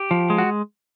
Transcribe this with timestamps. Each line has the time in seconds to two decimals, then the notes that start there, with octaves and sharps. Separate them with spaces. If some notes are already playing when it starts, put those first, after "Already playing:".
Already playing: G4
0.11 F3
0.30 G#3
0.38 F#4